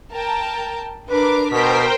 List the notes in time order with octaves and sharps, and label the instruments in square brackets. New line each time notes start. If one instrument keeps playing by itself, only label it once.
[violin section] A#4 G5 A5
[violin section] D4 A#4 D6 [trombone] B4
[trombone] B2 [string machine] A#4 C5 G5 [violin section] B6